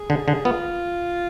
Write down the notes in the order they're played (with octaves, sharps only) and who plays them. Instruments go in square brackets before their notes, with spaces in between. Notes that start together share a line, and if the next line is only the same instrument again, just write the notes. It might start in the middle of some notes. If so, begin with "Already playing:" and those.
Already playing: [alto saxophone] G#4
[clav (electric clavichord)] D3
D3
[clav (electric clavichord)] B3 [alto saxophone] F4